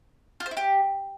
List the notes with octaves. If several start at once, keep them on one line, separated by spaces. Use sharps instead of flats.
F4
C5
E4
G4